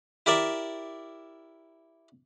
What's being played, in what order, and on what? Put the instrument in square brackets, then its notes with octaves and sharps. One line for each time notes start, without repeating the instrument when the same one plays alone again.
[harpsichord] E4 G4 A#4 D5 E5